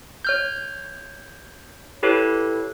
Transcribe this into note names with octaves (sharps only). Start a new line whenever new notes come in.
C#5 F6 G6
E4 G4 A4 B4 C#5